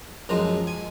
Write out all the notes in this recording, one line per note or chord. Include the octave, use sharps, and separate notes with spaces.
F#2 F3 G#3 A#5
G#5